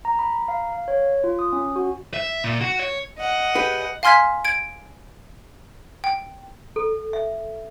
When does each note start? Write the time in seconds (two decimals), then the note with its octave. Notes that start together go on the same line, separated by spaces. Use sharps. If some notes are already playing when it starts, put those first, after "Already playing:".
0.05 A#5
0.19 B5
0.35 A#5
0.48 F5
0.72 F5
0.88 C#5
1.24 F4
1.39 D#6
1.53 C#4
1.76 F#4
2.14 E5
2.44 A#2
2.61 F#4
2.79 C#5
3.19 D#5 F#5
3.55 G4 G#4 B4
4.03 F5 G#5 C6 F6 G#6 B6
4.45 G#6 D7
6.04 G5
6.76 A4
7.13 E5